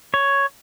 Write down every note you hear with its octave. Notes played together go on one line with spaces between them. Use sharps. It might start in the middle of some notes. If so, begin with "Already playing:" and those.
C#5